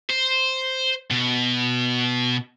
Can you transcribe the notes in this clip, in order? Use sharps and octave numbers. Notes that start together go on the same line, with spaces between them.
C5
B2